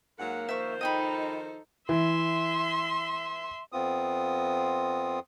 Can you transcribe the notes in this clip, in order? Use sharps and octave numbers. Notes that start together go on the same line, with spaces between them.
G#2 F#3 A#3 F#5
D#3 F3 C5 E5 C#6
D#4 A4 D#5 G5 B5
E3 E5 C6
F2 B3 C4 F4 D#6